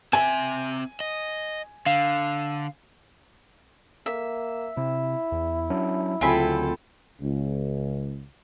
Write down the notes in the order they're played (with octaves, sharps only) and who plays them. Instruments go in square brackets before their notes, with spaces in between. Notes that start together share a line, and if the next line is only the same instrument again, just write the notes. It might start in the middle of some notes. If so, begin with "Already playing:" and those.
[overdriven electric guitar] C4 E5 [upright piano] G#5
[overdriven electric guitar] D#5
[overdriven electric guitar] D3 [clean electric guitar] F5
[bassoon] A#3 [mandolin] E5
[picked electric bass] C3 [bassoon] E4
[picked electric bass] E2
F#3 C#4 D4
[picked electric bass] D2 C#3 F#3 [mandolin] C4 G#5 B5 [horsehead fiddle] F4 A4
[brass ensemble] C#2